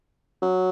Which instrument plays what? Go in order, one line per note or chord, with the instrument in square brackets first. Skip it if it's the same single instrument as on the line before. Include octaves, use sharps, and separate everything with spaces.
[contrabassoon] F#3